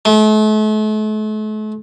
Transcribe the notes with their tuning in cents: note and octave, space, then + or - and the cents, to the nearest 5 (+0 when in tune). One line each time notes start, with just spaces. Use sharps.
A3 -40